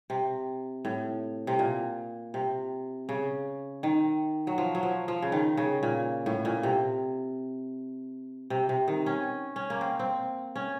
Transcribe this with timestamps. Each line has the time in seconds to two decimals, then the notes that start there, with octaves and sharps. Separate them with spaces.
0.10 C3
0.85 A2
1.47 C3
1.59 A#2
2.34 C3
3.09 C#3
3.83 D#3
4.47 F#3
4.58 F3
4.75 F#3
4.83 F3
5.08 F3
5.22 C#3
5.32 D#3
5.57 C#3
5.83 A#2
6.26 A2
6.45 A#2
6.63 C3
8.50 C3
8.69 C3
8.88 D#3
9.06 C#4
9.56 C#4
9.70 A#3
9.81 C4
9.99 C4
10.56 C#4